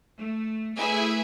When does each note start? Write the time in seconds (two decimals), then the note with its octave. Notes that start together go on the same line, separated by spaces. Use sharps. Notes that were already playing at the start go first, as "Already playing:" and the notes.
0.18 A3
0.77 A3 E4 G#4 B4 E5 G#5